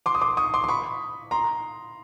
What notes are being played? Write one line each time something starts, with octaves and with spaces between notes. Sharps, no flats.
C6 D6
D#6
C6 D6
C#6 D#6
C6 D6
C6
B5 C#6
A#5 C6